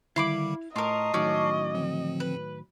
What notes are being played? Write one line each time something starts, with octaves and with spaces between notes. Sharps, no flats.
D3 D#3 G3 E4 F5 B5 D6
A2 F4 A#4 D#5 A5 C#6 C7
A2 D#3 F#3 C#4 D5
D3 F3 C4
B4